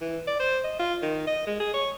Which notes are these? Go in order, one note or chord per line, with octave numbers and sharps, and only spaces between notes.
E3
D5
C5
D#5
F4
D#3
D#5
G#3
G#4
C#5